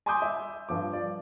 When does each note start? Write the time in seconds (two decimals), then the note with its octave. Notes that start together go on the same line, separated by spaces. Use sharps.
0.06 G#5 B5 C6 D6 D#6 G6
0.22 E5
0.69 G2 F3 D6
0.93 D5